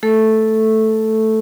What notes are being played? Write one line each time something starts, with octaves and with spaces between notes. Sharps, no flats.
A3 A4